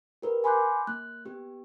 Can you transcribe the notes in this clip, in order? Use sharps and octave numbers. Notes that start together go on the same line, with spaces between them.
G4 A#4 B4
G#5 B5 C6 D6 F#6 G6
A#3 F#6
B3 G4